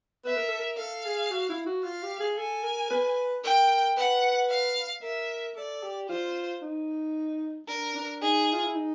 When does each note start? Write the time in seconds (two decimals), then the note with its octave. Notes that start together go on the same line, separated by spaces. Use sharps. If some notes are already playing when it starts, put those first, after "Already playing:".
0.25 B4 E5
0.36 A#4
0.48 A4
0.59 A#4
0.78 A4 F5
1.05 G#4
1.31 F#4
1.49 E4
1.66 F#4
1.84 F4 F5
2.03 G4
2.20 G#4
2.38 A4 G#5
2.63 A#4
2.91 B4
3.44 A#4 G5
3.97 B4 F#5
4.50 F5
5.02 A#4 E5
5.56 A4 D5
5.83 G4
6.09 F4 C5
6.62 D#4
7.68 D4 A#4
7.95 D4
8.22 D#4 G#4
8.53 F4
8.64 E4
8.75 D#4